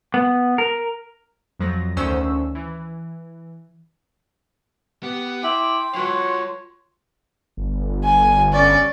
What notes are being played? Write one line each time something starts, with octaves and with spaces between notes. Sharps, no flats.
B3
A#4
F2 F3 F#3 A#6
D2 D#3 C#4 C5 C#6 E6
E3
B3 G4
E4 G5 C6 D6
F#3 F4 B4 C#5
G1
G#5
C#4 D5